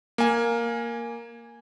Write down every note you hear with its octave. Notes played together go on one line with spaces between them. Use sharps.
A#3 G#5